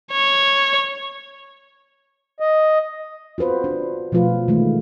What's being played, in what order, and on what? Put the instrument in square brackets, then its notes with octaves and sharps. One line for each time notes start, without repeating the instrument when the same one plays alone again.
[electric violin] C#5
[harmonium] D#5
[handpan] F4 F#4 B4 C5
D4
B2 F3 A3 F4 B4
D#3 E3 G#3 A3